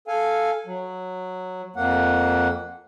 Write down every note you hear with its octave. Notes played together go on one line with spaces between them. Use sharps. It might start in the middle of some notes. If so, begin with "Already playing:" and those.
A4 F5 G#5
F#3
F2 A#3 F#5